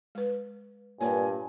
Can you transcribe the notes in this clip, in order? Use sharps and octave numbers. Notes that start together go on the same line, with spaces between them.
G#3 B4
G2 A#2 A#4 B4 C#5 G#5